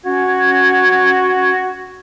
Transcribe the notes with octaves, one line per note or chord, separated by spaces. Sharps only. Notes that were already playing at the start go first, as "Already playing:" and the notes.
C#4 F#4 G#6